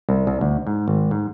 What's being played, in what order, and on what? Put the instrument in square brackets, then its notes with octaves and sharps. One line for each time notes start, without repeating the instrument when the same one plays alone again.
[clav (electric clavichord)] C2
C2
D2
G#2
G#1
G#2